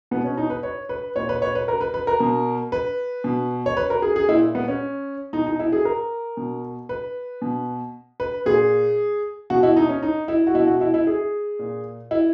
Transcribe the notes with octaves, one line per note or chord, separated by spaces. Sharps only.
B2 B3
C#4
D#4
B4
C#5
B4
A#2 C#5
B4
C#5
B4
A#4
B4
B4
A#4
B2
B4
B2
C#5
B4
A#4
G#4
G#4
A#2 E4
B3
C#4
B2 D#4
D#4
E4
G#4
A#4
B2
B4
B2
B4
A#2 G#4
B2 F#4
E4
D#4
C#4
D#4
E4
F#4
B2 E4
F#4
E4
E4
G#4
A#2
E4